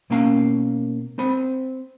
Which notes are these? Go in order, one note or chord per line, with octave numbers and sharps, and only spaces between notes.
B2 A#3 C#4 F5 A#5
C4 C5 B5